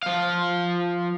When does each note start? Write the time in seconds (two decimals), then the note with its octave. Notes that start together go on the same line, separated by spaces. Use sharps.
0.03 F3 F5